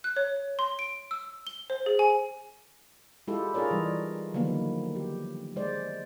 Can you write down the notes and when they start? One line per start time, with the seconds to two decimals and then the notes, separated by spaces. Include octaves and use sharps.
0.04 F#6
0.16 C#5
0.59 C6
0.79 D7
1.11 E6
1.47 G7
1.70 C5
1.86 G#4
1.99 G#5
3.28 G#3 E4 F4 G4 A4
3.54 D#4 F4 G#4 A#4 C#5 D5
3.71 E3 G3
4.34 D3 D#3 F3 F#3 A#3 B3
4.95 G4
5.56 G#3 C5 D5